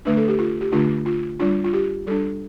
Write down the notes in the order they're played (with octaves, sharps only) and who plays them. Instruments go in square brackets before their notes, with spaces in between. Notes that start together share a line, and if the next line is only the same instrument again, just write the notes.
[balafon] D3 A3 D4 B4
A4
G4
F4
G4
D3 A3 D4 F4
F4
G3 D4 F4
F4
G4
G3 D4 A4